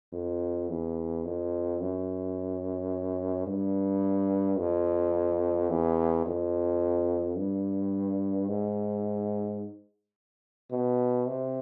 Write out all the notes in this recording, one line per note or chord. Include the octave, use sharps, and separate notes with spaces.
F2
E2
F2
F#2
G2
F2
E2
F2
G2
G#2
B2
C3